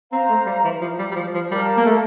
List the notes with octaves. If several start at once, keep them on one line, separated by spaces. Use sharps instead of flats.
C4 C5 F5 A#5
A3
G3
E3
F3
G3
G3
F3
F3
G3 A#4 F5 A5
A#3
A3